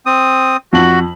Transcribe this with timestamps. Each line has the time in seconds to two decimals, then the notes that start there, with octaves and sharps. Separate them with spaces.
0.06 C4 D#6
0.73 F2 F#4 F#7